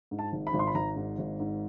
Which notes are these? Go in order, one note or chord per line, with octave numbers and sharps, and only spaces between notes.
G#2
A5
G#1
B5
G#1
C6
B5
G#1 A#5
G#2
G#1
G#2